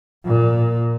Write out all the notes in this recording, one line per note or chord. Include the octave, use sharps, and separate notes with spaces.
A#2